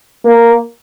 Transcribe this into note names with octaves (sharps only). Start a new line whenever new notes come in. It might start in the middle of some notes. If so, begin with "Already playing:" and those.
A#3